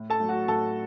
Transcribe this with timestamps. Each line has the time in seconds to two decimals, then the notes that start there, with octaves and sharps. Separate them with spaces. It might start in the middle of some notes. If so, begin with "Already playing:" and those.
Already playing: A2
0.10 A4 A5
0.20 F#3 A3
0.29 F#4 F#5
0.48 A2 A4 A5